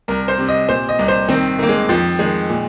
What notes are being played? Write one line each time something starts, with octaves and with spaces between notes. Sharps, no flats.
C2 A#4
C5
C3
D#5
A#2 C5
D#5
C2
C5
D#3 C4
D#3 A#3
G#3
F2 F3
D#3 G#3
A#2